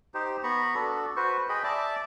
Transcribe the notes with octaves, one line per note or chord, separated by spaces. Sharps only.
D#4 G4 C5
B3 A#5 B5 C#6
D4 F#4 A4
F#4 B4 C5 C#6
G#4 D#5 G5 B5
D5 E5 A5 D6